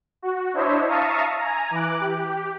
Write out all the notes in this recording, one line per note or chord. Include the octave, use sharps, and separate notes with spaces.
F#4
D4 E4 C5 C#5 D#5 E5
E5 F5 A5 A#5 C#6 D#6
G#5 A#5
E3 D6 F#6
G4